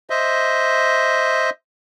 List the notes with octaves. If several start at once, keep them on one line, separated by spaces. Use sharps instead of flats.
C5 D#5 E5